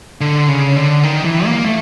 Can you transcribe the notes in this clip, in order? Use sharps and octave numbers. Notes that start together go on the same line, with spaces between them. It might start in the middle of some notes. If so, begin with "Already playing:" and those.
D3
C#3
D3
D#3
E3
A#3
A3